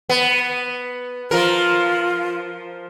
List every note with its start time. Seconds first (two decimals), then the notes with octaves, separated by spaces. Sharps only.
0.09 B3
1.31 F3 F4 A#4